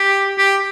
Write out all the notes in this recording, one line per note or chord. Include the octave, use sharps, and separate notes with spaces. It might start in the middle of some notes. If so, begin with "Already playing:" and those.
Already playing: G4
G4